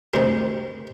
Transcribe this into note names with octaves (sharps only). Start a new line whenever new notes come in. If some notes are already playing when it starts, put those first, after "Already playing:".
D2 C3 D#3 G#3